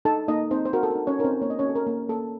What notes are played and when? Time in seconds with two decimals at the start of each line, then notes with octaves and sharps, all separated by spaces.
0.05 D#4 A4 A5
0.28 A#3 D#4 D#5
0.51 C4 D#4 C5
0.66 C5
0.73 F#4 A#4
0.83 A4
0.91 A#4
0.96 D#4
1.07 C#4 C#5
1.19 D#4 A#4
1.24 C4 C5
1.41 A#3 C#5
1.50 D#5
1.59 C#4 C#5
1.65 F#4 A4
1.76 A#4
1.87 A#3
2.09 A#3 A4